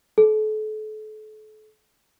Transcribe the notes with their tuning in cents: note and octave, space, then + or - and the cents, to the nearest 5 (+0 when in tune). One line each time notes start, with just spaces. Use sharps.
A4 -35